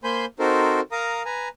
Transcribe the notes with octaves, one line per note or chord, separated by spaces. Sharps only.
A#3 C5 G#5 B5 C6 G6
C4 D#4 F#4 A4 A#4 C5
A#4 F5 A#5 D#6
B4 G#5 A#5